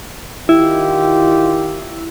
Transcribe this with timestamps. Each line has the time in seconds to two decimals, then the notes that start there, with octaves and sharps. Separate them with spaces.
0.49 D#3 E4 F4 G4